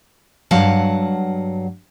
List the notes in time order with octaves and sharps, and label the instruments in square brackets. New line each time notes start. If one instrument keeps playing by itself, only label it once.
[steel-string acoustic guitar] G2 F#3 F5 F#5 A5